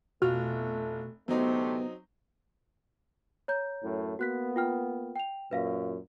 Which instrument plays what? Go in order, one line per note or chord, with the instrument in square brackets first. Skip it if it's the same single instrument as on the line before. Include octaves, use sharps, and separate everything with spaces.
[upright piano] F1 F4 F6 [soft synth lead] B2 [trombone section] A3 [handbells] F#4
[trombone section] D2 C3 A3 [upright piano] F#3 C4 D#4 [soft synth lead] B3
[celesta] C#5 A#5 G6
[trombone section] F#2 A2
[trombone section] A#3 B3 [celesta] F#4 F#6 B6
[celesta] F4 G5 F6
G5 F7
[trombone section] F#2 A#2 [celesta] B4 E5 F5